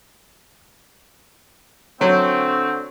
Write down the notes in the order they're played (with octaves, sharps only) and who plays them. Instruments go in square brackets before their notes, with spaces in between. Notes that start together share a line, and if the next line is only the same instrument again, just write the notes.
[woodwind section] D3 A3 C4 [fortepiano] F#3